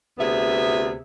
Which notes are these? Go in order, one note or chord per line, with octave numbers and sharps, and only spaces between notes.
D2 C3 B3 G#4 E5